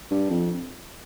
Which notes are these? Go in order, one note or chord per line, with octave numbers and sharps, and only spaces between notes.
G2
F2